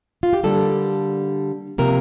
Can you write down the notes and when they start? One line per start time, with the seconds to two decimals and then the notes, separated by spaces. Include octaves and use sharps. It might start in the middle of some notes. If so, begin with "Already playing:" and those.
0.23 F4
0.33 G4
0.43 D3 G3 A#3 A4
1.78 C3 F3 A#3 A#4